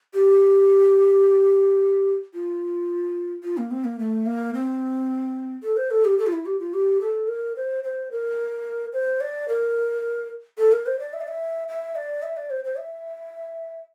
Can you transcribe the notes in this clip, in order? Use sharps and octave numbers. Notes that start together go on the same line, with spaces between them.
G4
F4
F4
A#3
C4
A#3
A3
A#3
C4
A4
C5
A4
G4
A4
F4
E4
G4
F4
G4
A4
A#4
C5
C5
A#4
C5
D5
A#4
A4
A#4
C5
D5
E5
D5
E5
E5
D5
E5
D5
C5
C5
E5